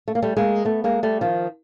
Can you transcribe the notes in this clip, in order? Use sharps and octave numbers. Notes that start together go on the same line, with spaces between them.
A3
A#3
G3 A3
G#3 A#3
A3 B3
G#3 A#3
G3 A3
D#3 F3